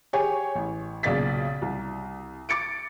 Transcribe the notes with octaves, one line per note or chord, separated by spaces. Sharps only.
G4 G#4 C#5 G#5
A1
B1 A#2 C#3 D5 A6 B6
C2
D6 A6 C#7 D7